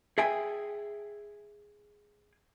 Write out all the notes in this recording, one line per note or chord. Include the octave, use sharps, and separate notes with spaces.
G#4 E5 G5 G#5